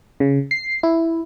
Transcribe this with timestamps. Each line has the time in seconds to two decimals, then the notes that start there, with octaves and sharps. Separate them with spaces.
0.20 C#3
0.51 C7
0.83 E4